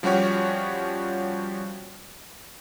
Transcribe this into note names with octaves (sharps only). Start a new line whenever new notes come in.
F3 G3 C#4 F#4 G4 C#5